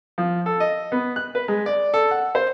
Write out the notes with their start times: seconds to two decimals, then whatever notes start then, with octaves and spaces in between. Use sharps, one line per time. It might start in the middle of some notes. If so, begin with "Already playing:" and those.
0.18 F3
0.46 A4
0.60 D#5
0.92 B3
1.16 F#6
1.35 B4
1.48 G#3
1.66 D5
1.94 A4
2.11 F#5
2.35 C5